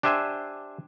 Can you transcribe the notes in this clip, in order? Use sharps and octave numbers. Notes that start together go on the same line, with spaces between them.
D4 G4 C5 E5 G#5